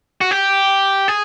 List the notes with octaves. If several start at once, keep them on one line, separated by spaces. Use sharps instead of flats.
F#4
G4
G#4